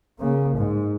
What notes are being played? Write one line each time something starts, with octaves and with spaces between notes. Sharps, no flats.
C#3 A#3
G#2